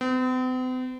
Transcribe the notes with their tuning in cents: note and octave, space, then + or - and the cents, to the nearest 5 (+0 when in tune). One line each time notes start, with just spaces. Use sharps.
C4 -45